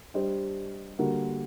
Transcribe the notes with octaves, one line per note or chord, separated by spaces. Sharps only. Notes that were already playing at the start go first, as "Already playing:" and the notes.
G3 D4 G4 C5 D#5
D3 G3 A#3 F#4